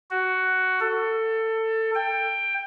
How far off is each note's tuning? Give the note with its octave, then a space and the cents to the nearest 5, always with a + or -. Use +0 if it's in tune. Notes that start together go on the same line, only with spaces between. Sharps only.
F#4 +10
A4 +20
G5 +15